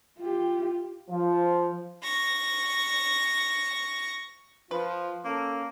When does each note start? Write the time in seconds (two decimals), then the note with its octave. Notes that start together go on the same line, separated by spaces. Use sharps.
0.19 F4 G4
1.10 F3
2.03 C#6 A#6
4.71 F3 F4 B4
5.25 A#3 C#4 A4